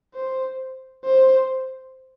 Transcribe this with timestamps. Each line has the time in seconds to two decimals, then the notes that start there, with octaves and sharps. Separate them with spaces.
0.14 C5
1.05 C5